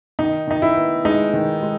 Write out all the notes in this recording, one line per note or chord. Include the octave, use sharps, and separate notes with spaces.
D#3 D#4
D#3 D#4
E4
B3
G#3 D#4
D#3
G#3